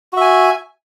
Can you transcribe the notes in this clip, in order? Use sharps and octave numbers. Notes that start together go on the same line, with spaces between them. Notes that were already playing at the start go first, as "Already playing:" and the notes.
F#4 E5 G#5